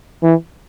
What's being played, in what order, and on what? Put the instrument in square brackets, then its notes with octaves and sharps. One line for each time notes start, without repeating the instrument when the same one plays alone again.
[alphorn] E3